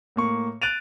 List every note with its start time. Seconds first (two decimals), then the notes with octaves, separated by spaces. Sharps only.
0.16 A2 A#3 C#6
0.62 F#6 A6 D7 D#7 F7